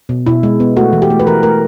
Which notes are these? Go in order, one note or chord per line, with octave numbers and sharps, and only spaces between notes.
B2
B2 E4
G#3
B3
A3 F#4
E3
G4
A3
B4
E3 A#4
A3 A#4